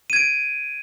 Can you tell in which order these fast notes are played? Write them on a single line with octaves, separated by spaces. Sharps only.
D#7 G#6 D7